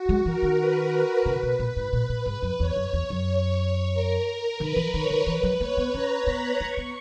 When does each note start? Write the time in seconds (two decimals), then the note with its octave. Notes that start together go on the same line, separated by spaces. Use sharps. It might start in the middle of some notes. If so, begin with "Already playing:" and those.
Already playing: F#4
0.09 G#3
0.26 E3 A#4
0.42 D#3
0.59 B4
1.26 C#3
1.43 B2
1.59 A#2
1.76 G#2
1.93 A#2 B4
2.09 A#2
2.26 G#2
2.42 F#2
2.60 E2 C#5
2.76 F#2
2.93 E2
3.10 F#2
3.93 A#4
4.27 A#4
4.60 D#3 B4
4.76 E3
4.94 D#3 C#5
5.10 D#3
5.26 E3 B4
5.43 F#3
5.60 A#3 C#5
5.77 B3
5.94 C#4 A#5
6.27 B3 B5
6.60 A#3 C#6
6.77 B3